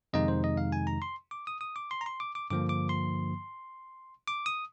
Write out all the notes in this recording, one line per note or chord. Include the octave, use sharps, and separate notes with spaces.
F2 C3 D#3 G#3 D#4 D#5
C5
D#5
F5
G#5
A#5
C6
D6
D#6
D#6
D6
C6
A#5
C6
D6
D6
G2 D3 F3 A#3 D6
D6
C6
D6
D#6